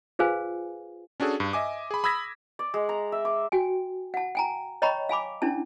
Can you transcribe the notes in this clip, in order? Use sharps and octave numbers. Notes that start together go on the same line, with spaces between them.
F4 G#4 B4 C5 F5 G#5
C#4 D4 F#4 G#4 A4
G2
D#5 E5 G#5 D6
G#4 B5
B5 D#6 E6 G#6 A#6 B6
D5
G#3
A#5
E5
D6
F#4 G5 G#5
F#5 A5
G5 G#5 A#5
C#5 D#5 G5 A#5 B5 C#6
F5 G#5 B5 D6
C#4 D4 E4 A5